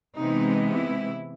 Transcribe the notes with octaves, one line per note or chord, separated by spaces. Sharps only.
C3 E3 G#3 B3 D#4
E4